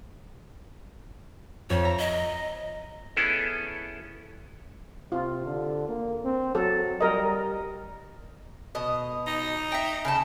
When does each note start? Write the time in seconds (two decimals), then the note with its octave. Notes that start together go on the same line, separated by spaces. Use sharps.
1.70 F2 C#5
1.83 E5 A#5
1.99 D#5
3.16 B3 C#4 E4 G#4 A4
5.12 C3 F4
5.46 D3
5.89 A#3
6.25 C4
6.55 F#3 A4
7.01 G3 A#4 D#5
8.75 B2 D#5
9.27 D#4
9.72 E5 G5
10.05 C#3 G5 A5